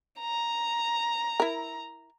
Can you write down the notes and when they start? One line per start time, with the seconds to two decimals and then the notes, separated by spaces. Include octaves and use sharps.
0.20 A#5
1.40 E4 A#4